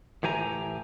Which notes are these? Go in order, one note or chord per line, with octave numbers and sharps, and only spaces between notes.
A2 E3 G4 G#5 A#5